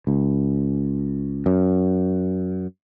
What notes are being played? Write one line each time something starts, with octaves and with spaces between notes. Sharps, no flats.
C#2
F#2